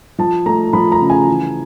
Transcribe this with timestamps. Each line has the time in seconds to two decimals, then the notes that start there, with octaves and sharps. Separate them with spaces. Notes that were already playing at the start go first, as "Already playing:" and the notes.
0.19 F3 A5
0.46 A3 A#5
0.73 F3 B5
0.92 A#5
1.01 C#3
1.10 G#5
1.27 E3